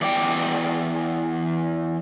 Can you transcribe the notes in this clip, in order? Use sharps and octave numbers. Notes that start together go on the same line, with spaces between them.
E2 D5 G5